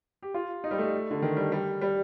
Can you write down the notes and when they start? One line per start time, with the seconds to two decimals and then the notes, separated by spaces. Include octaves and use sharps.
0.22 G4
0.34 F4
0.64 D#4
0.71 G3
0.78 A3
1.11 D3
1.22 D#3
1.37 G3
1.52 G3
1.81 G3